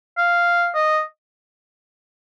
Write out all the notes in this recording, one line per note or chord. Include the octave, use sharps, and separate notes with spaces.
F5
D#5